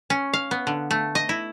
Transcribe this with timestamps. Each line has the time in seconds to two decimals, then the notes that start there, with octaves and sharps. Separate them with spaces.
0.10 C#4
0.33 F5
0.51 B3
0.67 D3
0.91 A3
1.15 D#5
1.29 E4